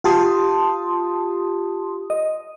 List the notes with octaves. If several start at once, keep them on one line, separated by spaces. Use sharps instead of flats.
F4 G4 A5 C6 D#6
D#5